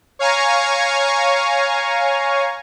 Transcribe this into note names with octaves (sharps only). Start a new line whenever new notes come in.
C#5 F5 G#5 A#5 C#6